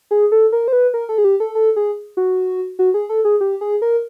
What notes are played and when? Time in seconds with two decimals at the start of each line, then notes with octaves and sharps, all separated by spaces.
0.11 G#4
0.32 A4
0.52 A#4
0.68 C5
0.73 B4
0.94 A#4
1.09 A4
1.18 G#4
1.24 G4
1.40 A4
1.55 A4
1.76 G#4
2.17 F#4
2.79 F#4
2.94 G#4
3.09 A4
3.25 G#4
3.41 G4
3.61 G#4
3.82 A#4